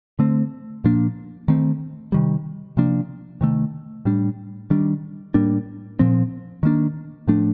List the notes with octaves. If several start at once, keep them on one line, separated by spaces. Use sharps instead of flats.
D3 A3 C4
A#2 F3 A#3 D4
D#3 A3 C4
C3 D#3 G3
C3 F3 A#3 D4
C3 D#3 A3
A2 G3 D4
D#3 G3 D4
A2 G3 A#3 D4
A#2 F3 C4
D#3 A#3 D4
A2 F3 A3 D4